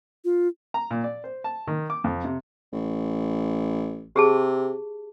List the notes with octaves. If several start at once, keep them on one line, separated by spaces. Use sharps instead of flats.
F4
A#5
A#2
D5
C5
A5
D#3
D6
F2
C3
A1
C3 G4 G#4 A5